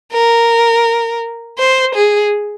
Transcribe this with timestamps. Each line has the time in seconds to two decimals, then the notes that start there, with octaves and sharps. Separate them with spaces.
0.13 A#4
1.59 C5
1.95 G#4